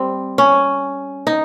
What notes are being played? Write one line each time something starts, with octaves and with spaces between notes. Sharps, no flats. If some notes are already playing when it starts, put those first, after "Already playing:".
Already playing: G3 C4
C#4
D#4